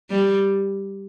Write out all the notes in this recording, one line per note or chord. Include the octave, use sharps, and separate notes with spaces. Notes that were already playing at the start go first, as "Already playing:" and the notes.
G3